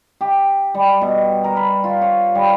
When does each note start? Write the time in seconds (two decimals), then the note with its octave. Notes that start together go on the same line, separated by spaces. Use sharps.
0.21 G4
0.74 G3
1.01 B2
1.44 A#4
1.57 B5
1.84 F4
2.02 C#5
2.35 G3